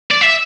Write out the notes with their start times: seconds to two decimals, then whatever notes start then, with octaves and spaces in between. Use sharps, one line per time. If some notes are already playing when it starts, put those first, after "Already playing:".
0.11 D5
0.22 E5